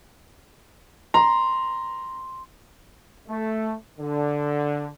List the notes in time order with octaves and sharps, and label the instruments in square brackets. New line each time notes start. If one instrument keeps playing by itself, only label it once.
[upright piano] A#5 [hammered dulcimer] C6
[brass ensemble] A3
D3